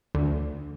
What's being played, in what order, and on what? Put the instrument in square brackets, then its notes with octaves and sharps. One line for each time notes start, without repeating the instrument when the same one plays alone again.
[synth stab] D2